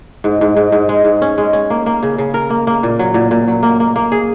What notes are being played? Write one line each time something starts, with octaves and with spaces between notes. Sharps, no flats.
G#2
G#2
G#2
G#2
G#3
G#2
C#4
G#3
C#4
A#3
A#3
C#3
C#3
A#4
A#3
A#3
A#2
F#3
A#2
A#2
F#3
A#3
A#3
A#3
G#4